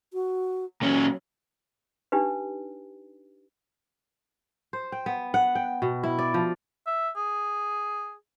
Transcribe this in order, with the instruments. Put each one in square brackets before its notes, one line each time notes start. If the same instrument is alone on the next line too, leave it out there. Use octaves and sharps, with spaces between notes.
[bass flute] F#4
[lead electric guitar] A#2 C#4 [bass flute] F#3
[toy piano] D4 D#4 G4 B4
[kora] C5
G5
B3
F#5
G5
B2
E4
D5
F3
[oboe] E5
G#4